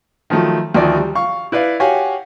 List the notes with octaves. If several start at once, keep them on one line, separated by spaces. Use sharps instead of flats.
D#3 F3 F#3 A3
D2 D#3 F3 D5
G3
F5 C#6
E4 B4 D5 F5
F#4 G4 C#5 F5 F#5 G#5